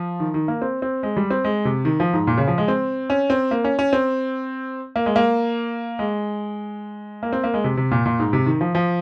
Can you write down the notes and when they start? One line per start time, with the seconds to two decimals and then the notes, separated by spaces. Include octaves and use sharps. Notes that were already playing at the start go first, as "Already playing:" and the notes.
Already playing: F3
0.20 D#3
0.34 D#3
0.48 A#3
0.62 C4
0.82 C4
1.03 G#3
1.17 G3
1.30 C4
1.44 G#3
1.65 C3
1.85 D#3
2.00 F3
2.13 G#2
2.27 A#2
2.37 C#3
2.47 F3
2.58 G#3
2.68 C4
3.10 C#4
3.30 C4
3.51 A#3
3.64 C#4
3.79 C#4
3.93 C4
4.96 A#3
5.06 G#3
5.16 A#3
5.99 G#3
7.23 A#3
7.32 C4
7.44 A#3
7.54 G#3
7.64 C3
7.77 C3
7.91 A#2
8.06 A#2
8.19 G#2
8.33 C3
8.46 D#3
8.61 F3
8.75 F3